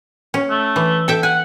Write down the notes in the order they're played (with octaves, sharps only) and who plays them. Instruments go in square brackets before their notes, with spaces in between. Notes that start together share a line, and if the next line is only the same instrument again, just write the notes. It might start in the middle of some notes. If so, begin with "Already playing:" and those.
[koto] C#4
[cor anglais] A3
[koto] E3
A4 E5 G5
[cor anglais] F#5 [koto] G#5